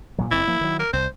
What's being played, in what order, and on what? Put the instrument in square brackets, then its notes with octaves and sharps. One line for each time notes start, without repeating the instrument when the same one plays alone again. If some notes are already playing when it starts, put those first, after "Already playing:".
[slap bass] G2 A#2 F#3
[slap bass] F#1 F2 C4 [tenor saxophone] E4
[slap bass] F3 A#3
D#3 F#3
[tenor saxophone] A#4
[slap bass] C2 [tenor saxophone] C5